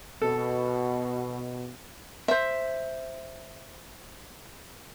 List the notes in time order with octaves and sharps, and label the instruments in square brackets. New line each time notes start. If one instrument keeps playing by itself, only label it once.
[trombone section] B2 [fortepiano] A4
[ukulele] C5 E5